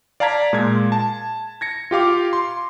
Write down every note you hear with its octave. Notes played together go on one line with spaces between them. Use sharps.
D5 F5 A5 A#5 G#6 B6
A#2 G#3 F4 G#6
A5
G#6 A#6 C#7
F4 G4 F5 D6
C6